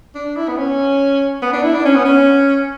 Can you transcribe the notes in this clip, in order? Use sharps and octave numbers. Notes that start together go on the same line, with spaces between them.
D4
E4
B3
C#4
B3
D4
E4
D4
C#4
B3
C#4